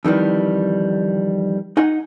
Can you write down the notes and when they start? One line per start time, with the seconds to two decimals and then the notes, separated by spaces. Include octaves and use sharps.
0.05 F2 D#3 E3 G3
1.77 D#4 F#5 G#5